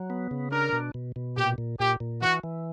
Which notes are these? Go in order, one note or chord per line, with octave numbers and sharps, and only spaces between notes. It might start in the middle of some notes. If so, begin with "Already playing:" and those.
Already playing: F#3
B3
C#3
D4 A#4
B2
B2
B2
A#2 G4
A#2
A#2 G4
A#2
E3 F#4
E3